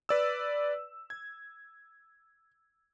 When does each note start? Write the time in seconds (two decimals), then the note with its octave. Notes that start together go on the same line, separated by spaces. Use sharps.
0.09 B4 D5 E6
1.10 G#6